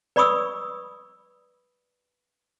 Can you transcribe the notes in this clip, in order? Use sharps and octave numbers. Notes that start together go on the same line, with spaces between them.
B4 D5 B5 C#6 D#6 E6